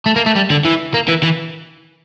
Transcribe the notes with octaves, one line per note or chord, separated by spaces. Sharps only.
A3
A#3
A3
G3
D3
E3
A#3
E3
E3